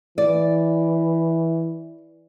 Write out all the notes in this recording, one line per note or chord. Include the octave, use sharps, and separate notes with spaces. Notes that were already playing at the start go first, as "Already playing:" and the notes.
E3 D5